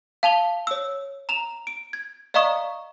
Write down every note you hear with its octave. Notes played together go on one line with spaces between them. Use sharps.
F5 A5 F7 G7
C#5 E6
A#5 E7 F7
D7
G#6
D5 D#5 F5 A#5 C#6 D#6